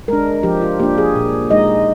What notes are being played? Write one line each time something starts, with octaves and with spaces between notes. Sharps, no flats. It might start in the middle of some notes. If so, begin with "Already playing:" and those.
G#3 D4 A#4
F3 G4
F4
A#3 D4 G4
G#4
A#2
G#3 D#4 D#5